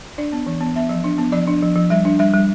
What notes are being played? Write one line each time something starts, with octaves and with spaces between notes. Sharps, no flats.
D4 D5
B3
E3
B3
B3 E5
F3
D4
B3
F3 D5
D4
F3
F3
G3 E5
D4
G3 E5
G3